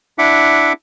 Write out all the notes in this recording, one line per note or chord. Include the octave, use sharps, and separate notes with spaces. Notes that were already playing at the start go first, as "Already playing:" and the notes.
D4 E4 E5 F#5 D6